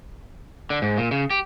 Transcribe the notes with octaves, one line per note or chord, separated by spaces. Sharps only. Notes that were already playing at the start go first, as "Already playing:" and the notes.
D3
G#2
A#2
C#3
G4